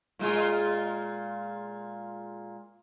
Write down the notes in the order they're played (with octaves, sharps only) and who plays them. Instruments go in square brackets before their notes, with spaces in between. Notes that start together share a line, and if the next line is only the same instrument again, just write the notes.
[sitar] A#2 G#3 F4